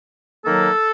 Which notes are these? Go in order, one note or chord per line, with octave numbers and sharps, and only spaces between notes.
D#3 F#3 A#3 A4